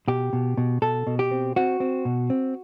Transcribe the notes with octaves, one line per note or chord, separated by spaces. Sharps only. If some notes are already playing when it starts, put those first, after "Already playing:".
B2 G4
B2
B2
B2 A4
B2
G4
C4
C4 F#4
C4
B2
C4